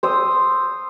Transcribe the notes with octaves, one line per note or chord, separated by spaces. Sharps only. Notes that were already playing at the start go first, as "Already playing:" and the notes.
C5 D#6 E6